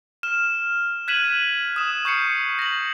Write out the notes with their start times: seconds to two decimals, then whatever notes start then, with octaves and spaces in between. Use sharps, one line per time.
0.23 F6 E7
1.08 F#6 G#6 B6 D#7 E7 F#7
1.76 D#6 E7
2.05 C#6 G6 C7 C#7
2.59 A#6 F#7